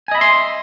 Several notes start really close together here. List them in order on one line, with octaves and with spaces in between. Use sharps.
G#5 D#5 B5 E5 C6